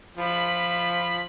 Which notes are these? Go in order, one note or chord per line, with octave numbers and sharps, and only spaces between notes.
F3 B5